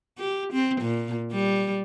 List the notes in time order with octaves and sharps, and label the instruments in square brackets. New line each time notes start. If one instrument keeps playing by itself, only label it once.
[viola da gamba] G4
C4
A#2
G3